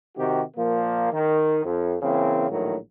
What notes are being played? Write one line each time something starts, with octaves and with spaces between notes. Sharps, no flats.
C3 D#3 F#4 G4
A#2 F3 A#3
D#3
F2
C#3 E3 A#3 C4
A#1 A2 D#3 F#3